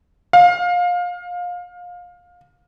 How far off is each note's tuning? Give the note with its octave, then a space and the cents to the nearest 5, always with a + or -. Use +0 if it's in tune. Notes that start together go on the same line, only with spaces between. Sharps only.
F5 +25